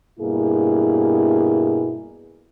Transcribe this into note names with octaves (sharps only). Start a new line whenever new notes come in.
G2 B2 A#3 E4 G#4